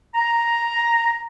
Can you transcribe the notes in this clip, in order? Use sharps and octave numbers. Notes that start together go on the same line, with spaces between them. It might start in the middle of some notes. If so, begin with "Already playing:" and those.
A#5